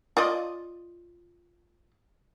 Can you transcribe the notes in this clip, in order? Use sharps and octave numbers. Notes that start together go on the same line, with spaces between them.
F4 D5 D#5